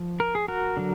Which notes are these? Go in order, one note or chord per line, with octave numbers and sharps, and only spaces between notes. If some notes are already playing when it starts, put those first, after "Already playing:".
Already playing: F3
A#4
G#4
F#4 A#4
D3 F#3